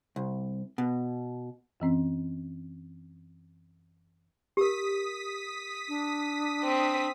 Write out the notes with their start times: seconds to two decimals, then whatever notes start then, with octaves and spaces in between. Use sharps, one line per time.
0.16 C2
0.78 B2
1.80 F#2 E3 C4 C#4
4.57 G4 A#4 D#6 B6
5.88 D4
6.64 C4